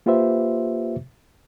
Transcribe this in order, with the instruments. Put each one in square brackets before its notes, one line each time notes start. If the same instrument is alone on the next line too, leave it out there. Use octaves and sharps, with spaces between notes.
[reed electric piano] A#3 F4 G4 B4 C5 E5